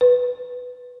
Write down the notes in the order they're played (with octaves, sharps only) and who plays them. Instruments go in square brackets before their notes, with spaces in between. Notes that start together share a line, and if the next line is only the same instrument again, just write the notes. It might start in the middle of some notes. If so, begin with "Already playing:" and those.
[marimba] B4